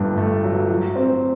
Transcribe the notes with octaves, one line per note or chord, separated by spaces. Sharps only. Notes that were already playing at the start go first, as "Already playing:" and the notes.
Already playing: G1 G2
A3
F#3
F#3
C4